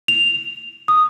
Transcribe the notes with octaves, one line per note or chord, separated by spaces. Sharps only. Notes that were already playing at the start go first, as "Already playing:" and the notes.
F7
D#6